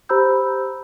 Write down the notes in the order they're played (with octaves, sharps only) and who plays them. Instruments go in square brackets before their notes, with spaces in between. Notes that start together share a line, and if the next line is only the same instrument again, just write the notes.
[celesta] G4 C5 A#5 B5 E6 G6